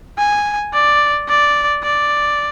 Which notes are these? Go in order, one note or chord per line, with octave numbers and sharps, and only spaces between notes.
G#5
D5
D5
D5